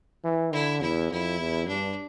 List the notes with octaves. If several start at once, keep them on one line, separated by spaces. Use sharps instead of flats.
E3
D3 E4
E2 E4
F2 E4
E2
G2 D4